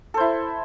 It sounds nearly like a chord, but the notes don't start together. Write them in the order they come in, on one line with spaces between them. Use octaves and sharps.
A4 C5 E4